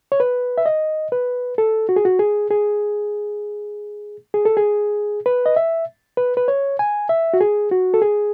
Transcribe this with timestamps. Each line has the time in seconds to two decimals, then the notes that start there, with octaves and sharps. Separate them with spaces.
0.12 C#5
0.20 B4
0.58 E5
0.66 D#5
1.12 B4
1.58 A4
1.89 F#4
1.96 G#4
2.05 F#4
2.19 G#4
2.50 G#4
4.34 G#4
4.45 A4
4.57 G#4
5.26 B4
5.46 D#5
5.56 E5
6.17 B4
6.37 B4
6.48 C#5
6.79 G#5
7.09 E5
7.34 F#4
7.41 G#4
7.71 F#4
7.94 A4
8.02 G#4